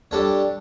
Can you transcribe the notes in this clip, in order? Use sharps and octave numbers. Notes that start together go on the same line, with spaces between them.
G3 D4 A4 C#5